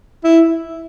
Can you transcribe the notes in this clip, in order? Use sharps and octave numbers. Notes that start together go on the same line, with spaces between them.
E4